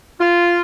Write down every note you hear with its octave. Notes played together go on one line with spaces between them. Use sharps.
F4